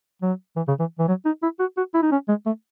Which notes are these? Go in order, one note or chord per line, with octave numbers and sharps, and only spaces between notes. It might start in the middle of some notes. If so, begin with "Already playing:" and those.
F#3
E3
C#3
E3
E3
F#3
D#4
E4
F#4
F#4
E4
D#4
C#4
G#3
A3